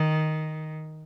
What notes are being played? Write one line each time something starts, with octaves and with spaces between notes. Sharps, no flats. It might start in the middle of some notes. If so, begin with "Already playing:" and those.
Already playing: D#3